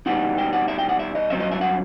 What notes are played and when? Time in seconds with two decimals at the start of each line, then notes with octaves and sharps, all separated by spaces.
0.06 B2 G3 C4 D#4 F#5
0.38 G5
0.53 F#5
0.68 E5
0.79 G5
0.89 F#5
0.99 E5
1.15 D#5
1.30 G2 F#3 C4 E5
1.40 D#5
1.51 E5
1.61 F#5